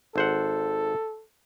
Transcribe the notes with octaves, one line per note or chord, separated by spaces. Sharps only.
G#1 A4 C5 F#5